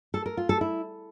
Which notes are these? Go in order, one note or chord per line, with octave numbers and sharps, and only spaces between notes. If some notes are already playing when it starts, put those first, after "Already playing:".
A4
A#4
F4
A4
E4